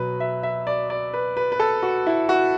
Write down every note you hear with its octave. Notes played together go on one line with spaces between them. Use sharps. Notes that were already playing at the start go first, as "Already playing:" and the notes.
Already playing: B2 F#3 B4
E5
E5
D5
D5
B4
B4
B4
A4
F#4
E4
F#4